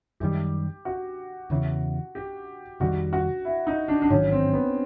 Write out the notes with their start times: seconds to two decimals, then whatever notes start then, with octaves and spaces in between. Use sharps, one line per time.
0.20 F#2 D#3 G3 G4
0.85 F#4
1.50 E2 C#3 E3
2.15 G4
2.80 F2 C3 D#3 G3 F#4
3.13 F#4
3.45 E4
3.67 D#4
3.88 D4
4.02 D4
4.10 A1 G#2 D#3 F#3 C#4
4.32 C4
4.53 B3